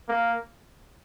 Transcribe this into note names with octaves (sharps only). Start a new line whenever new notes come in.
A#3